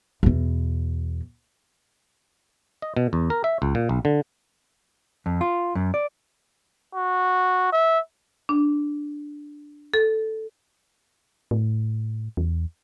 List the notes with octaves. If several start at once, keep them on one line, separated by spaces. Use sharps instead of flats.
E2 B2
D#5
B2
E2
A#4
E5
C#2
A#2
B1
D3
F2
F4
F#2
D5
F#4
E5
D4
A4
A2
E2